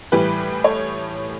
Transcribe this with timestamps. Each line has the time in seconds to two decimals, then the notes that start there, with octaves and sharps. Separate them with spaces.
0.12 A2 E3 G3 G4 B4
0.64 A4 C#5